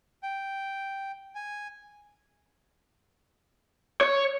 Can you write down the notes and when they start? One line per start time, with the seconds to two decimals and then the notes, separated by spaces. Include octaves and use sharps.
0.23 G5
1.35 G#5
4.01 C#5